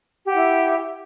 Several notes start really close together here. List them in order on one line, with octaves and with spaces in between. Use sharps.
G4 F#5 E4 E5